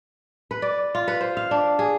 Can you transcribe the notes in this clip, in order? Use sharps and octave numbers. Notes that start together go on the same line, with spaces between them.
B4
D5
F4
B4
C5
F5
D4
G#4